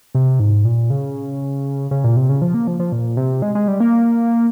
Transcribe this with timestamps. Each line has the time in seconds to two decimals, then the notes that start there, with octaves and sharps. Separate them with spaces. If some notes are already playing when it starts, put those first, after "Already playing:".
0.15 C3
0.40 G#2
0.65 A#2
0.90 C#3
1.91 C#3
2.04 A#2
2.17 C3
2.29 C#3
2.42 F3
2.54 A#3
2.67 F3
2.80 F3
2.92 A#2
3.17 C3
3.42 G#3
3.55 G#3
3.68 G3
3.80 A#3